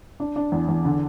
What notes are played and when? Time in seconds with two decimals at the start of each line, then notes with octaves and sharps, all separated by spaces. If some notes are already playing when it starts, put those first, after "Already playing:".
0.20 D4
0.36 D4
0.52 E2
0.69 E2
0.85 D3